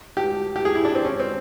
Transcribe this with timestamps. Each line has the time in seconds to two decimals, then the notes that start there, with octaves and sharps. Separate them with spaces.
0.17 G4
0.56 G4
0.65 G#4
0.75 E4
0.85 D4
0.95 C4
1.05 C#4
1.20 C4